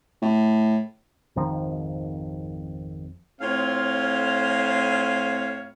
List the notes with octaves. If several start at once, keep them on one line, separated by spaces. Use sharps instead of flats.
A2
G#1 F2 D#3 F3
A2 C4 F4 C#5 F5